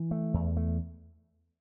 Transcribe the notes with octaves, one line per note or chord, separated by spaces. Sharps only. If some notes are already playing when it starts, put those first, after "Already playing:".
Already playing: E3
A3
E2
A3